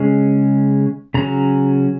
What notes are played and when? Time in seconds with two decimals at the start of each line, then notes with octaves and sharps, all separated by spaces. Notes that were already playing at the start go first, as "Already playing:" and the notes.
Already playing: C#3 G#3 C#4
1.14 C#3 F#3 C#4 A#5